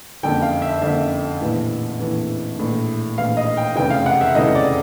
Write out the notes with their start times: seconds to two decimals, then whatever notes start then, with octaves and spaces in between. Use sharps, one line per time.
0.23 F#1 F2 D3 G5
0.42 F5
0.62 E5
0.81 F#1 F2 D3 E5
1.41 A#1 A2 E3
2.00 A#1 A2 E3
2.59 A#1 A2 E3
3.17 A#1 A2 E3 F5
3.37 D#5
3.57 G5
3.76 F1 E2 C#3 E3 A3 G5
3.90 F5
4.06 F#5
4.21 E5
4.35 F1 E2 C#3 E3 A3 D#5
4.55 D5